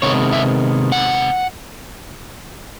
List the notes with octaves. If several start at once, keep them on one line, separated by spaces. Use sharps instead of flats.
C3 D#3 G#3 B3 C#5
E5
F#5